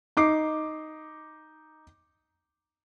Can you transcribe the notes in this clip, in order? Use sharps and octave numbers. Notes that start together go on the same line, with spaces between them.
D#4 D6 C7